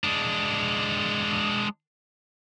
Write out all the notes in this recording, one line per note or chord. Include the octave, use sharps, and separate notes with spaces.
G#3 D4